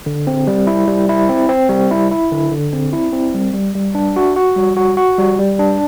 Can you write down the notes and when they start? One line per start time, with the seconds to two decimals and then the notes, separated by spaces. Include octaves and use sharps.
0.06 D3
0.27 C4
0.47 G3
0.67 E4
0.87 G3
1.09 E4
1.29 C4
1.49 C4
1.69 G3
1.91 E4
2.11 E4
2.32 D3
2.52 D3
2.73 C4
2.93 E4
3.13 C4
3.34 G3
3.54 G3
3.75 G3
3.95 D4
4.16 F#4
4.36 F#4
4.56 G3
4.77 F#4
4.97 F#4
5.18 G3
5.39 G3
5.59 D4